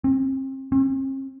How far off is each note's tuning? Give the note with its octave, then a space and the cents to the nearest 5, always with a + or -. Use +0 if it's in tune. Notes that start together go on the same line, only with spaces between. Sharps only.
C4 +35
C4 +45